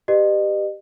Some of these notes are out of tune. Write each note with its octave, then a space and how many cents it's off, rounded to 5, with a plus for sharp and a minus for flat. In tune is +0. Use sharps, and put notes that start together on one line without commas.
G4 +0 B4 +5 D#5 -40